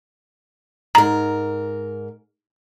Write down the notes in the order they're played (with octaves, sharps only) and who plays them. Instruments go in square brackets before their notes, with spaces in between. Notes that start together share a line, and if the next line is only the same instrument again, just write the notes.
[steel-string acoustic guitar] G#2 A#4 [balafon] A#5